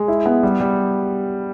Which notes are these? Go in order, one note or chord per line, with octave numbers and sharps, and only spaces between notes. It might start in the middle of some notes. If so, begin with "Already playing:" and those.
Already playing: G#3
E4
B3
G3
G3